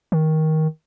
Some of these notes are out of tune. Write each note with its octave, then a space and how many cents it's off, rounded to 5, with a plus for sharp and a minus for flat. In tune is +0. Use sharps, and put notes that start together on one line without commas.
D#3 +15